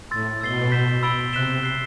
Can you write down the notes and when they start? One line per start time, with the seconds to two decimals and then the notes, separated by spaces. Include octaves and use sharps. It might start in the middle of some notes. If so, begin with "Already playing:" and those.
0.11 A2 C6 E6 A6
0.41 B2 E6 A6 C7 G7
0.72 G6 B6 E7 G7
1.03 B5 E6 A6 D7 G7
1.33 C3 F#6 B6 E7 G7
1.63 F#6 C7 G7